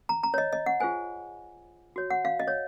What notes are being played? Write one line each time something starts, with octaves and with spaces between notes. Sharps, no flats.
A#5
A#5
C#5
D#5
D#5
F#5
F4 G#4 C5 G#5
F#4 C#5
F#5
F5
D#5
C#5